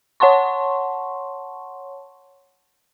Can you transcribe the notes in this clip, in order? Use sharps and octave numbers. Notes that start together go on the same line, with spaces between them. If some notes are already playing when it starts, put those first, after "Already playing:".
C#5 F#5 A5 C6 C#6